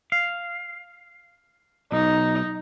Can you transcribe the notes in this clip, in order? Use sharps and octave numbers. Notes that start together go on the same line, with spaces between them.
F5
B1 D#4